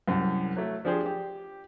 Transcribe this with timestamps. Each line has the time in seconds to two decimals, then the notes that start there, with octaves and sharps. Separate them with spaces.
0.08 C2 F#2
0.57 F#3 A3
0.85 F3 D4 G4 G#4 C5
1.06 G4